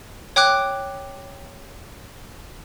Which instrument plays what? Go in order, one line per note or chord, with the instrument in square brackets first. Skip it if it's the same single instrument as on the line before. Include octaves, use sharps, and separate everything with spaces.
[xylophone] C#5 G5 D6 F#6